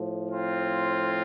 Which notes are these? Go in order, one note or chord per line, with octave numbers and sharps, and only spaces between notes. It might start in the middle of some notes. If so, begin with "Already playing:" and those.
Already playing: A2 F3
C4 F4